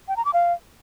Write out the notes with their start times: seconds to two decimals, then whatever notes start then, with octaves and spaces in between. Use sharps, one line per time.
0.08 G5
0.17 A#5
0.25 D6
0.34 F5